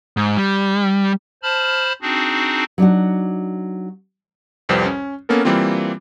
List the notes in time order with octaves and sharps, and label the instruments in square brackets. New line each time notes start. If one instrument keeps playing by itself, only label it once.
[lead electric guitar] G#2
G3
[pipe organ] C5 A5 B5 F6
C4 D4 D#4 F#4 G#4
[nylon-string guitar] F#3 D4 D#4 F#4
[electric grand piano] C2 F2 G3 B4 C5
C#4
A#3 B3 C#4 A4 A#4
E3 G3 A#3 C4 F4